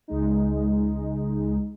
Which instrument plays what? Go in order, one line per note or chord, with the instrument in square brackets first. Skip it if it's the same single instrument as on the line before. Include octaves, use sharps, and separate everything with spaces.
[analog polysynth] C#2 G#3 D#4